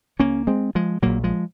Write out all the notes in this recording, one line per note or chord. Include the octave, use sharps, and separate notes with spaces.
C#2 C#3 A#3 C#4
G#3 C4
F3 G#3
A#1 A#2 F#3 A#3
F3 G#3